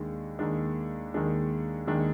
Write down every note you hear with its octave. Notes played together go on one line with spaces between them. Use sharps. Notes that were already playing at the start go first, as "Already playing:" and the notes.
Already playing: D#2 D#3 G#3 D4
D#2 D#3 G#3 D4
D#2 D#3 G#3 D4
D#2 D#3 G#3 D4